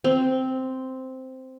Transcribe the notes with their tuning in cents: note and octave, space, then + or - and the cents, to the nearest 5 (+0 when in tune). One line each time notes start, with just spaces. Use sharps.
C4 -5